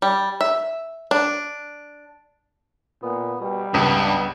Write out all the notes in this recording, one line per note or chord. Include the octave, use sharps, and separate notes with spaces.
G3
E5
D4
A#2 B3
B2 G3
C#2 G2 B3